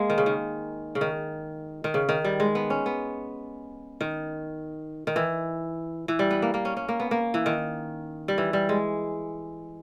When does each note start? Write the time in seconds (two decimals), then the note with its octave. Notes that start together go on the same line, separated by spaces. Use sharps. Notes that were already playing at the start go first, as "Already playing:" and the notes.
Already playing: G#3 A#3
0.10 D#3
0.18 C#3
0.26 D#3
0.95 C#3
1.01 D#3
1.84 D#3
1.94 C#3
2.09 D#3
2.25 G3
2.40 G#3
2.55 B3
2.70 C#4
2.86 B3
4.01 D#3
5.07 D#3
5.16 E3
6.08 E3
6.19 G3
6.31 B3
6.42 A#3
6.54 A#3
6.65 C#4
6.77 C#4
6.89 A#3
7.00 B3
7.11 A#3
7.34 E3
7.46 D#3
8.28 G3
8.38 E3
8.53 G3
8.69 G#3